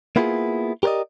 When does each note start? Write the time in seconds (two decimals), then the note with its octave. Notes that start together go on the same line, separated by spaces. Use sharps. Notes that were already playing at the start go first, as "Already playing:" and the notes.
0.16 A#3 B3 E4 F4 G4 G#4
0.83 G4 A#4 B4 D5 D#5